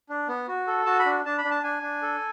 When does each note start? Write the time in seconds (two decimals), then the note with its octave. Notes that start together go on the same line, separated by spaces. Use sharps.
0.09 D4
0.28 B3
0.48 F#4
0.67 A4
0.86 F#4 A5
0.99 B5
1.06 D4
1.25 D4 A5
1.38 B5
1.45 D4
1.51 A5
1.63 D4 G#5
1.83 D4
2.02 A4